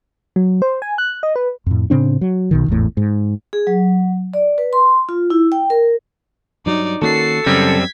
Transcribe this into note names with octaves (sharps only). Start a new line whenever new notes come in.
F#3
C5
G#5
F#6
D#5
B4
F2 A2
A2 C#3 C4 D4
F#3
B1 B2 D#3
G#1 E2 A2
G#2
G#4
F#3
D5
B4
C6
F4
E4
G5
A#4
G2 F#3 D#4 D5
D#3 A#3 C#4 F#4 A4 C7
F#2 C#3 G3 C4 G#6 B6